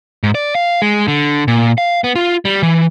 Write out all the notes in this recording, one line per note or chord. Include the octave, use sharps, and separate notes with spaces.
G#2
D5
F5
G#3
D3
A#2
F5
B3
F4
G3
E3